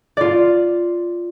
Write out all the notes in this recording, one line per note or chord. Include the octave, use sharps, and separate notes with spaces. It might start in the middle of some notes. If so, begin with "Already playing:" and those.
F4 D5